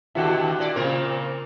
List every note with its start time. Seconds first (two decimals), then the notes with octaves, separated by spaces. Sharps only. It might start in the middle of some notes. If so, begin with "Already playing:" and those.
0.15 D#2 B2 D3 E4 F#4 G4
0.59 A#2 D5
0.76 A#2 C#3 A#3 C4 A#4